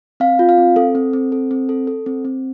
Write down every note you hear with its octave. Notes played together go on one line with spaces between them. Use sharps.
C4 F5
F4
F5
C4
C4 A4
C4
C4
A4
C4
A4
A4
C4
C4